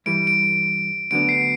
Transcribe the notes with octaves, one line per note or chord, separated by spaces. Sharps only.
G2 E3 G3 D7
D7
D2 D3 F#3 B3 D4 D7
C7